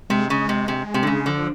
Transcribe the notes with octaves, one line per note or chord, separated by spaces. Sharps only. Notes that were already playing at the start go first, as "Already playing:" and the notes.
C3 G#3
C#3 G#3
C3
C3
C3
D3
C#3 G#3
D3 F3